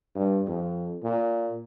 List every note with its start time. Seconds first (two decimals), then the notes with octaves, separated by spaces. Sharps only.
0.15 G2
0.47 F2
1.04 A#2